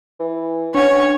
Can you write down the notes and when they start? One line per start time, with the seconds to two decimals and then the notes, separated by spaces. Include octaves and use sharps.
0.20 E3
0.75 C#4 D4 C#5 F#5 G#6